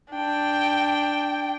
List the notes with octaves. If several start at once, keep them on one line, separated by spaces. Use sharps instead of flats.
D4 G5